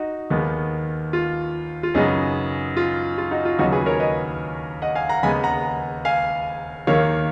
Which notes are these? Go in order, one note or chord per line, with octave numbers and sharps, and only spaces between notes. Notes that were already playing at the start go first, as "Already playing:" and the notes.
Already playing: D#4 F#4
D#2 D#3 G#3 B3
F4
F4
F#2 C#3 G#3 B3 D#4
F4
F4
D#4 F#4
F4
D#2 C#3 F#3 B3 D#4 F#4
G#4 B4
A#4 C#5
B4 D#5
D#5 F#5
F5 G#5
F#5 A#5
D#2 C#3 G#3 B3 G#5 B5
F#5 A#5
F5 G#5
D#2 D#3 A#3 C#5 F5